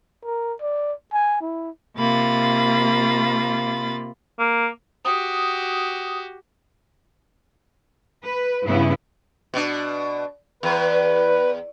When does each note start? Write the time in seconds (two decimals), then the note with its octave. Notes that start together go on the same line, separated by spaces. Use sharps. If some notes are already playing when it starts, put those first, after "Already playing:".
0.24 A#4
0.61 D5
1.13 G#5
1.42 E4
1.98 C3 A#3 F4 B5 A6
4.39 A#3
5.05 F#4 G4 D#6
8.24 B4
8.66 G2 C#3 B3 E4
9.54 B2 D4
10.63 E2 B4